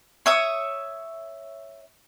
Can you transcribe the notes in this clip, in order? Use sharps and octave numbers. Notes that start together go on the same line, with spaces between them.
C#5 E5 D#6